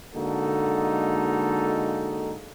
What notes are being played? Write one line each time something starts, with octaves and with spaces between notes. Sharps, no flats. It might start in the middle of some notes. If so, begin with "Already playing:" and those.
D3 G#3 A#3 D#4 F#4 A4